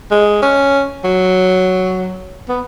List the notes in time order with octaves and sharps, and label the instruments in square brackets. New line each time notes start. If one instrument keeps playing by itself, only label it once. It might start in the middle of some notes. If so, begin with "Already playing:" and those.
[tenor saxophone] G#3
C#4
F#3
B3